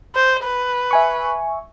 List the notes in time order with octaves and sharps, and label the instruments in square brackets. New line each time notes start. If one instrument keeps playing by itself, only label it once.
[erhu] C5
B4
[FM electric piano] E5 G#5 C#6